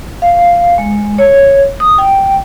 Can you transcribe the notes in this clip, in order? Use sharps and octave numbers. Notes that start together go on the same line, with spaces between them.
F5
G#3
C#5
D#6
G5